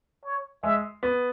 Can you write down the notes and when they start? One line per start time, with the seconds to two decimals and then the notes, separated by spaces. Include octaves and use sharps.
0.25 C#5
0.63 G#3 E5
1.03 B3